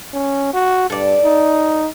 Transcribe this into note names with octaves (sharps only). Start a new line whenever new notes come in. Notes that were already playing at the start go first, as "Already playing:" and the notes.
C#4
F#4
G2 A4 D5
D#4